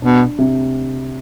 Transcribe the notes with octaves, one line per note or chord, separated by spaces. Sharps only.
B2 D4
C3